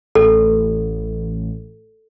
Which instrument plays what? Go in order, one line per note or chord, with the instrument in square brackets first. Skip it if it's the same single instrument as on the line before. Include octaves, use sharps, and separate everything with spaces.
[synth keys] A1 [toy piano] A4